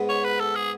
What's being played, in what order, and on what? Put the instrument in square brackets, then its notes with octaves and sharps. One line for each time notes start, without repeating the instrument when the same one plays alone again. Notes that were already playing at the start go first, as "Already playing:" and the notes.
Already playing: [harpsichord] G#2 G#3 B3
[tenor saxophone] C#5
B4
A4
G#4